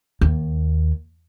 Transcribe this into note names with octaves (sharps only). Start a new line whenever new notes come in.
D#2